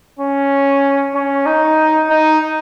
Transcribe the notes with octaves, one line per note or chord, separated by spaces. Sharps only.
C#4
C#4
D#4
D#4